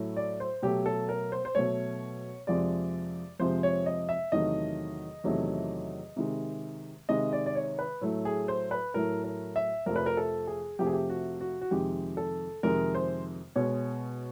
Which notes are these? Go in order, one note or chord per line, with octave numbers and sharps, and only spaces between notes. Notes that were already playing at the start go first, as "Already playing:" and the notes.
Already playing: A2 F#3 A3
D5
C5
B2 F#3 A3 G4
A4
A#4
C5
C5
B2 F#3 A3 C#5
F2 C3 F3 G#3 D5
F2 C3 F3 G#3 C5
C#5
D#5
E5
E2 C3 D#3 F#3 A3 D#5
E2 C3 D#3 F#3 A3
C3 D#3 G#3
C3 D#3 G#3 D#5
D5
D5
C#5
B4
A2 F#3 A3
G#4
C5
B4
A2 F#3 A3 A#4
A#4
E5
F2 C3 F3 A3 A#4
B4
A#4
A4
G#4
F2 C3 F3 A3 G4
G#4
G4
F#4
F#4
F#4
F2 C3 D#3 G#3 G4
A4
F2 C3 D#3 G#3 A#4
C5
B2 G#3 C#5